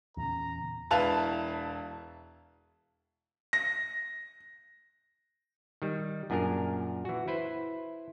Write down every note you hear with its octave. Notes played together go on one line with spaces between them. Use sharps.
E2 A#2 C#3 A#5
E1 E4 B4 F5 A5 F7
A#6
D#3 G3
F#2 A#2 D4 G#4 A#4
E3 F#4
E4 B4 C5